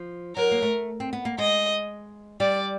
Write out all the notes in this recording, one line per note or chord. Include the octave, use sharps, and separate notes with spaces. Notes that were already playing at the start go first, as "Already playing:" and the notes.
Already playing: F3
F#3 A#4
A#3
A3
C4
B3
A#3
G#3 D#5
G3 D5